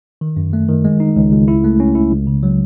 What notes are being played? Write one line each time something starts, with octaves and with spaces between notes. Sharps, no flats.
D#3
F#2
A3
D#3
G#3
D#4
C#2
C#2
E4
A3
C#4
E4
C#2
C#3
F#3